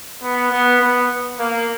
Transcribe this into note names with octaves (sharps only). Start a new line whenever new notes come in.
B3
B3
B3
A#3